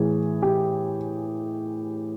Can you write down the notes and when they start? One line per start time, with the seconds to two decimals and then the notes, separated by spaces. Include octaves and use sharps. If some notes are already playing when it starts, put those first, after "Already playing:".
Already playing: A2 E3 G#4
0.42 G4